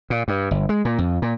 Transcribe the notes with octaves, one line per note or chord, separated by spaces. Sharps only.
A#2
G2
G1
G#3
A#2
F2
A#2